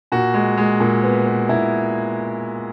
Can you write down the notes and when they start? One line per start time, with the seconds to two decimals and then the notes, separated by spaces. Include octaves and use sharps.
0.12 A#2 F#4
0.34 G#3
0.57 G#3
0.80 A#2
1.04 B3
1.26 B3
1.49 A#2 E4